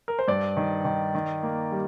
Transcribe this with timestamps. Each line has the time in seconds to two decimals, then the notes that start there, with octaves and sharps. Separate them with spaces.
0.08 A#4
0.19 C5
0.28 G2 D5
0.57 D#3
0.85 D#3
1.15 D#3
1.43 A#3
1.72 G3